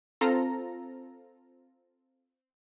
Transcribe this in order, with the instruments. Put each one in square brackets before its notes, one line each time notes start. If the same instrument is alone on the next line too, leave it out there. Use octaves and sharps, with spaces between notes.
[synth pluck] C4 F4 A4 A#5